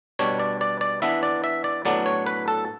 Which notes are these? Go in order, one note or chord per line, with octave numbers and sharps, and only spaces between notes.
B2 G3 D4 C#5
D5
D5
D5
E3 B3 D4 E5
D5
E5
D5
A2 F#3 B3 D4 D5
C#5
B4
A4